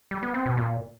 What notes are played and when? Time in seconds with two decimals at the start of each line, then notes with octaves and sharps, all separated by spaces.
0.11 G3
0.23 B3
0.34 C4
0.46 B2
0.57 A#2